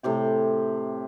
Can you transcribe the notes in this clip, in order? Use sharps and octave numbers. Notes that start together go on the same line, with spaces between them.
A2 C3 G4 G5